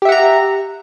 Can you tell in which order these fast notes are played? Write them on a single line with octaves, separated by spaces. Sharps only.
G4 E5 F#5 A#5